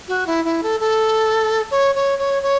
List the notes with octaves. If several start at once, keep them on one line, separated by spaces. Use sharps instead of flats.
F#4
E4
E4
A4
A4
C#5
C#5
C#5
C#5